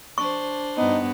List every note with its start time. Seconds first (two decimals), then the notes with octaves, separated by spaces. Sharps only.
0.18 D4 C5 C#6
0.77 G2 B3 D#4